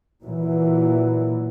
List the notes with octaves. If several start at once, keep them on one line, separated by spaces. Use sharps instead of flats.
A#2 E3 F#3